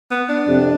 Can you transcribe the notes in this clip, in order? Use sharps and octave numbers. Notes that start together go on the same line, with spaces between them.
B3
D4
F2 C3